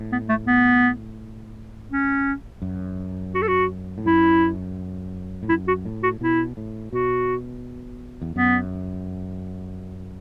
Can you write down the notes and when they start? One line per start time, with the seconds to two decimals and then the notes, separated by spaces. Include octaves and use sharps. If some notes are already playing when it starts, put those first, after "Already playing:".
Already playing: A2
0.12 B3
0.29 A3
0.47 B3
1.90 C#4
2.62 F#2
3.34 F#4
3.42 A4
3.48 F#4
3.98 A2
4.05 F#2 E4
5.43 A2
5.49 F#2 E4
5.67 F#4
5.85 A2
6.03 F#4
6.21 B2 E4
6.57 A2
6.92 B2 F#4
8.22 E2
8.36 F#2 B3